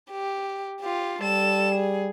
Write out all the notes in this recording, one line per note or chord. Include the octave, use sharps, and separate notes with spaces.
G4
F4 G4
G3 A4 E7
G#4